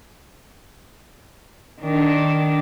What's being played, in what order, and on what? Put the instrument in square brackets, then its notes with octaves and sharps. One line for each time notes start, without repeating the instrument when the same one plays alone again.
[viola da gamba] D#3 D4